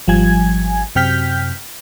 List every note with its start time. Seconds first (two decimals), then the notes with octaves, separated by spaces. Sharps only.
0.07 G#1 F3 G3 G#5 G#6
0.95 F#2 C3 G5 F6 G6 B6